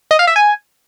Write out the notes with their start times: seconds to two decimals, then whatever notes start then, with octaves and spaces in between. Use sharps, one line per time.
0.11 D#5
0.19 F5
0.27 E5
0.36 G#5